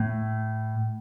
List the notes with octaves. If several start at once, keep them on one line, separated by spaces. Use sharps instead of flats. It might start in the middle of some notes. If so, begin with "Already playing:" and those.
Already playing: A2